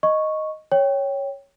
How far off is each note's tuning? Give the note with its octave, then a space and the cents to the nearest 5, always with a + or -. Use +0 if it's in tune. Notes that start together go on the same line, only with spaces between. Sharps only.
D#5 +0 C#6 -5
C#5 +0 G5 +0